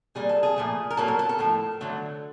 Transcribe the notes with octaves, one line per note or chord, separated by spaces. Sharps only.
A#2 G3 A#3 G#4
A4
G#4
A#2 F3 A3
A#4
A#2 F#3 A#3 A4
A#4
A4
A4
A2 F3 A#3
D3 F#3 A3